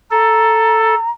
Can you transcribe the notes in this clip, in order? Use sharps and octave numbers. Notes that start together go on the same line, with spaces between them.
A4 A#5